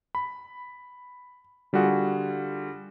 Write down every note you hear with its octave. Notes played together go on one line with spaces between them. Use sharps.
B5
D3 G3 F4 F#4 G#4